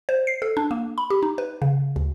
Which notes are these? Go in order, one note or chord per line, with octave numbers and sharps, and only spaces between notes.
C5
C7
A4
D4
A#3
B5
G4
D#4
B4
C#3
D2